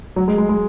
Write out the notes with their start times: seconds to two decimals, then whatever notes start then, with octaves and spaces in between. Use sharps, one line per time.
0.16 F#3
0.28 G#3
0.38 G#3
0.49 G#3